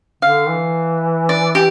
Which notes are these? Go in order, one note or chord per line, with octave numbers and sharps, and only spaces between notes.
D3 F5
E3
D5
G4